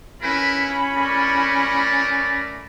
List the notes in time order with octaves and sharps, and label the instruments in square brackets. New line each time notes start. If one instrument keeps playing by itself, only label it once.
[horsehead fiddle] C#4 B5 [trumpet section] E4 A#4 B4
[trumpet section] A3 A#4 D5